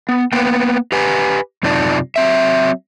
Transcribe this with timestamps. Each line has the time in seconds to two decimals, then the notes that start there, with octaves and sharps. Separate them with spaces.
0.09 B3
0.33 A#3 B3 G5
0.92 G4 B4 G#5
1.63 F#2 C3 D#4 F4 D5 A5
2.16 F#3 C4 E5